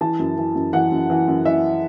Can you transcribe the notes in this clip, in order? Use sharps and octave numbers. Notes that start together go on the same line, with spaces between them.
E3 A5
F#2
E3
F#2
E3 F#5
F#2
E3
F#2
E3 E5